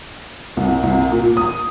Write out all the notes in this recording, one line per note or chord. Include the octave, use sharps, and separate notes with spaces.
C2
C2
A#2
D#6